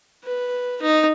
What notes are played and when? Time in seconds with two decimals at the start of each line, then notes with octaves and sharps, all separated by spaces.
0.24 B4
0.82 D#4